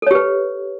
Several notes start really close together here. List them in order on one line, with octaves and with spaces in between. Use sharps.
A4 C#5 G4 B4